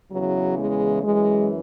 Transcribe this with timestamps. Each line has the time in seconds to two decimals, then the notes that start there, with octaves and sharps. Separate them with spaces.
0.10 E2 C#3 E3 F#3
0.57 G#3
1.02 F#2 E3 G#3